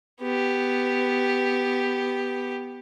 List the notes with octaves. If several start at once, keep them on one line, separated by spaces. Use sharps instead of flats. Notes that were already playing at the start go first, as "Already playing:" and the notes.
B3 G4